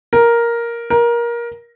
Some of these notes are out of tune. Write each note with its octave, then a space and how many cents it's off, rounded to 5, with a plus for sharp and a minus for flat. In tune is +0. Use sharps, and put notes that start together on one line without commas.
A#4 +5
A#4 +20